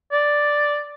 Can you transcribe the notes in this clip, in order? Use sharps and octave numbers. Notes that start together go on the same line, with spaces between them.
D5